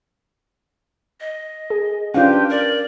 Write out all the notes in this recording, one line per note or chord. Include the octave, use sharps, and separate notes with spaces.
D#5
G#4
C#4 D4 F4 G4 B4 F5
A#4 D5